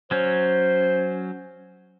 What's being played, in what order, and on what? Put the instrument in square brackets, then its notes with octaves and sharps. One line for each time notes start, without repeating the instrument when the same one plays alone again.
[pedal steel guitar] F#3 C#4 [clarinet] C5